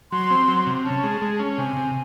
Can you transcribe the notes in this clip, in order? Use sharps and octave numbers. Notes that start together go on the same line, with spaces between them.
F#3 C6
C4
F#3
C3
C#4 A5
G#3
G#3
C#4
C3 G#5
C3